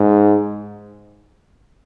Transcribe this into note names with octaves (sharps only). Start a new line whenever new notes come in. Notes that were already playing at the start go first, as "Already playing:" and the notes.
Already playing: G#2